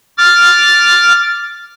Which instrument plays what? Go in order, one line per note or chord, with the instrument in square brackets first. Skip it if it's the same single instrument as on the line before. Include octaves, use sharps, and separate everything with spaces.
[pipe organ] D6 F6 A6